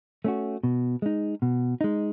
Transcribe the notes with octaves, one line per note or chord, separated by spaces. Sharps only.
A3 C#4 F#4
B2
G#3 D#4
B2
G#3 D#4